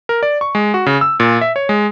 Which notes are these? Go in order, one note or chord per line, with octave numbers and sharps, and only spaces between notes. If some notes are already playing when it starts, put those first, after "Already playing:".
A#4
D5
C#6
G#3
F#4
C#3
E6
A#2
E5
C#5
G#3